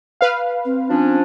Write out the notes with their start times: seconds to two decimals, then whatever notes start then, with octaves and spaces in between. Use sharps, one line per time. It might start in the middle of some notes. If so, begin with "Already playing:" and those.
0.21 B4 F5
0.65 C4
0.89 F3 C#4 D4